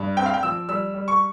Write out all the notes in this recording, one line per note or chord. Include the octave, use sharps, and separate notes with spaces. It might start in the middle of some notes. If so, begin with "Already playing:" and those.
Already playing: G2
C4 G5
F5
G5
F3 E6
G3 E6
G3
C#6